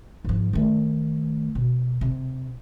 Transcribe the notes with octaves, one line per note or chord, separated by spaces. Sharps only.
G#2 F3
D#3 A3
B2
C3